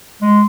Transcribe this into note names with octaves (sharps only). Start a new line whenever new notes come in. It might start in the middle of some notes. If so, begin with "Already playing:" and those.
G#3